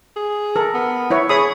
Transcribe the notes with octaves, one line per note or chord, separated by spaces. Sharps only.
G#4
A4 A#4
B3
E4 B4 C#5
G#4 C#5 B5 D#6